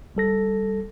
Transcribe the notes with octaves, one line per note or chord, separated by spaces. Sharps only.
G1 G3 A4 A#6